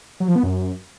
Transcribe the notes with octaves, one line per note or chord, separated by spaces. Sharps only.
F#3
F3
B3
F#2